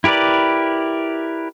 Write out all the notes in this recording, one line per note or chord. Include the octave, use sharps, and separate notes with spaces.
E4 G4 A#4 B4 D5